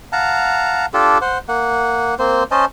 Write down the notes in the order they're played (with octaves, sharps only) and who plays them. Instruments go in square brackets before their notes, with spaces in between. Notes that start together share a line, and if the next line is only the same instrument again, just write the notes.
[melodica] F5 F#5 A5 A#5
D4 F4 G4 A4
C5 F#5
A#3 F#5
A#3 C4 C5
C#4 C5 D#5 A5